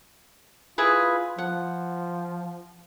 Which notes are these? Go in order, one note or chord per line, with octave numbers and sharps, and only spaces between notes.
E4 F4 G#4 B4
F3 F#5